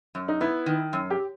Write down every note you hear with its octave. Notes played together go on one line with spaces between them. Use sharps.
F#2
D#4
B3 E4
D#3
F#2
G4